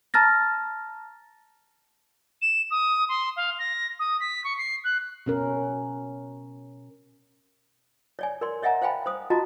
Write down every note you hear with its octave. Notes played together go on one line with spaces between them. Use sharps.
A5 A#5 F6 A6 A#6
E7
D#6
C6
F5
A#6
D#6
B6
C#6
C7
F#6
B2 C#4 A#4
C#5 D5 G#5
A#4 D5 C6
C#5 D#5 E5 F#5 G#5 A#5
C5 F5 G5 G#5 B5
C5 D#6
F4 F#4 D#5 A5 A#5